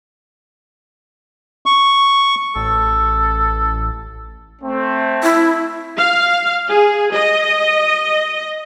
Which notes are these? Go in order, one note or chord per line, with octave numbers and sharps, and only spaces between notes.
C#6
A1 A4
A3 C4
E4
F5
G#4
D#5